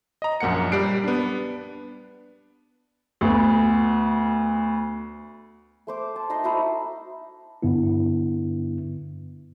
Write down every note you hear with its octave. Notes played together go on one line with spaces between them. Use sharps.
D#5 A#5
A#1 F#2 A#3 F#5 C#7
G3 G4 F#6 C7 D7
B3 D4
D2 B3
A3 C5 D6
A5
D#4 D#5 E5 C6
D#4 E4 F#4 C5
G2 D3 B3 D4 E4